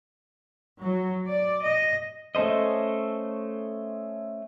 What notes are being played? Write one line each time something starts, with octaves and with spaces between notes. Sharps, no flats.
F#3
D5
D#5
A3 C#4 A4 C5 D#5